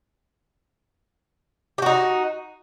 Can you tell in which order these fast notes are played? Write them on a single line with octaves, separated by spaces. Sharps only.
G4 F#4 D#4